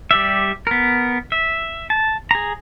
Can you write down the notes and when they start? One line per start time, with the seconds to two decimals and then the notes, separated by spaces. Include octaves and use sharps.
0.11 G3 G4 D5 E5
0.67 B3 A#4
1.32 E5
1.90 A5
2.31 G#4 A#5